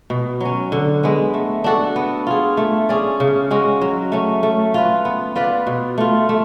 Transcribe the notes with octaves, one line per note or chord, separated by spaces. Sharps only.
B2
F#3 C#4
D3
G#3 B3
A3
D4 F#4 A4
B3
F4 G#4
A3
C#4 G#4 D5
C#3
G#3 C#4 F#4
F#3
A3 C#4
A3
F4 B4
B3
F4 B4 D5
B2
A3 F4
A3